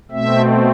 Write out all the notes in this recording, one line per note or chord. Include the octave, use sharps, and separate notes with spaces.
B2 A3 C4 E5